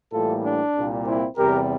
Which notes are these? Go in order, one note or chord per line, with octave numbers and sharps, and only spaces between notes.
A2 E3 G3 A#3 F4 A4
D4
C2 A#2 G3 A#3
C4 E4
E2 C3 G3 G4 A#4